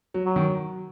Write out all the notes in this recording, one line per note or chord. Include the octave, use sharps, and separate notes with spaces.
F#3
F#3
D#3